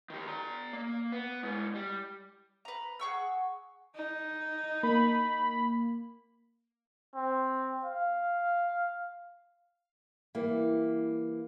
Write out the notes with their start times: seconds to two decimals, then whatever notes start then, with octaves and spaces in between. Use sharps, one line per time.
0.10 D#3 G4
0.27 D5 A#5
0.73 A#3
1.12 B3
1.43 G#3 E4
1.75 G3
2.65 B4 A#5
3.00 G#4 F#5 C#6 E6
3.95 D#4
4.83 A#3 B5
7.15 C4
7.85 F5
10.35 E3 G3 A#3 E4